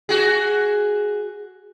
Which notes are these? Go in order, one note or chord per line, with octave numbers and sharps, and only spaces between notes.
F#4 G#4